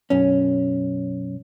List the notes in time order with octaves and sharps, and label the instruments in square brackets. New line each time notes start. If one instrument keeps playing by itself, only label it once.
[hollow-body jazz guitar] B1 F#2 C#4